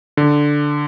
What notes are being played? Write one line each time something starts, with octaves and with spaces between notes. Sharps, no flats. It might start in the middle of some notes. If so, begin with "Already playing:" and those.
D3